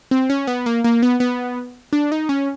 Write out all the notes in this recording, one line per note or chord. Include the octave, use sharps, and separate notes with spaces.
C4
C#4
B3
A#3
A#3
B3
B3
D4
D#4
C#4